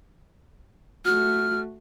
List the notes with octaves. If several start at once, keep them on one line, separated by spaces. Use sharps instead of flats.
A3 F#4 F6